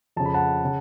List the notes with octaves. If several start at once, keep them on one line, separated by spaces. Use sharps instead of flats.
F2 C#3 A5
B5
F#5 A5
C#3